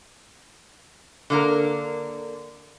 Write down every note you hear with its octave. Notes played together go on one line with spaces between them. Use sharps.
D3 A#3 A#4